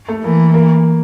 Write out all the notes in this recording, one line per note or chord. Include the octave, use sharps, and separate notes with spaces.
A3
E3 A#3
A#3